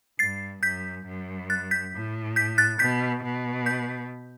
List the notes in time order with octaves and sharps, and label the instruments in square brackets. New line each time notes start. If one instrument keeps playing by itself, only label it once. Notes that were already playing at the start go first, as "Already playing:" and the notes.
[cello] G2 [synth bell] A6 C7
[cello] F#2 [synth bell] G6 B6
[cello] F#2
[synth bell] F#6 A6
G6 B6
[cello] A2
[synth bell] G6 B6
F#6 A6
[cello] B2 [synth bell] G6 B6
[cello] B2
[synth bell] G6 B6